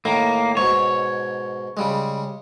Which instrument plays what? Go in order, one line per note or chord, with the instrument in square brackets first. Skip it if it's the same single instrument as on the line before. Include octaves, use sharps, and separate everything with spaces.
[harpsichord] A2 D#3 [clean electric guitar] A#3
[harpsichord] G#2 B2 [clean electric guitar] C#5
[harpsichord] C#3 G3 G#3